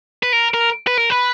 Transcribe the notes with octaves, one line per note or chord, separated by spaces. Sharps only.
B4
A#4
A#4
B4
A#4
B4